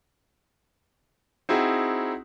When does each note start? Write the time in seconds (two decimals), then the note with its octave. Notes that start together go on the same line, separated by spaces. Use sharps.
1.49 C4 D#4 E4 F#4 G#4